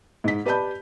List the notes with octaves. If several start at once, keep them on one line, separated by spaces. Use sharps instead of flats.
G#2 B6
G4 B4 D5 A5 B5 G6